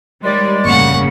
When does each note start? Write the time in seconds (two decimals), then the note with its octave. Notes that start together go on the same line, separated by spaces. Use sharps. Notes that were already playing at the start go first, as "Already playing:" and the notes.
0.24 D#2 G3 G#3 D5
0.65 G1 F2 A2 C#3 G3 A#3 F#5 C#6